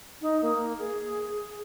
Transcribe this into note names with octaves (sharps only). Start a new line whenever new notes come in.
D#4
A#3
G#4